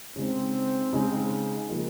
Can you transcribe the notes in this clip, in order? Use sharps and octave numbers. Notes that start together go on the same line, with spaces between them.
C#3 G#3 C4 D#4
C#3 G#3 D#4
C#3 F3 A#3 D#4